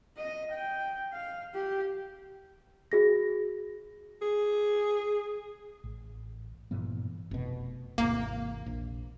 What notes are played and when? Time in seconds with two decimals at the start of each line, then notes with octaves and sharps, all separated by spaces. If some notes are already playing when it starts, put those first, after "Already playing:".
0.17 D#5
0.51 G5
1.13 F5
1.54 G4
2.92 F#4 G#4 A#6
4.22 G#4
5.84 A1
6.71 G2 A#2 E3 B3
7.31 F1 B2
7.98 G#1 E2 C3 A#3
8.66 A#1